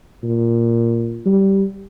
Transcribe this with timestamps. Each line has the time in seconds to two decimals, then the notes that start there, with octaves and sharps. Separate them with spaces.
0.23 A#2
1.26 G3